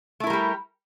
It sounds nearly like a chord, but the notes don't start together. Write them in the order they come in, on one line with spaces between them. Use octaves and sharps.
A3 E4 A#4 G3 G4